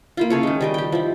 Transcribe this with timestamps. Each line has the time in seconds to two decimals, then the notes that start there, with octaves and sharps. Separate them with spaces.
0.17 A#3 E4 F4
0.30 C#3 A4 C#5
0.43 D#3 G#3
0.61 G3 D#5 G5
0.74 G4 G5
0.92 F3 E4